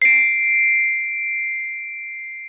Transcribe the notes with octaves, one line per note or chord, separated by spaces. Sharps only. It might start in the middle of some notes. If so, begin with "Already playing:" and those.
C7 D7